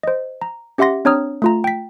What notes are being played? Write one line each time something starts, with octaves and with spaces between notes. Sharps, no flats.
C5 D#5
A#5
C#4 G4 E5 F#5 C6 A#6
C4 D4 C#5 A#5 D#6 F6
A3 F4 A#5
G5 B6